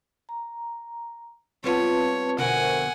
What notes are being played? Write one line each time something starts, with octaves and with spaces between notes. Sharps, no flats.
A#5
G3 B3 C4 F4 B4 C#5 A5
F2 B2 D3 A#4 C5 E5 F#5 G#5